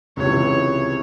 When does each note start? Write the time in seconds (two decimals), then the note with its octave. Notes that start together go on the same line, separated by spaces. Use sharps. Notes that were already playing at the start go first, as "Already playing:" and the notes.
0.17 C#2 C3 E3 C#5